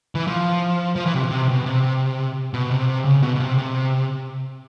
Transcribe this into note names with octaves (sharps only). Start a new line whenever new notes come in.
E3
F3
F3
E3
C3
B2
C3
B2
C3
B2
C3
C#3
B2
B2
C3
C3